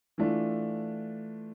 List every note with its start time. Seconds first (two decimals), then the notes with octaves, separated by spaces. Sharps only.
0.18 E3 A3 D4 F4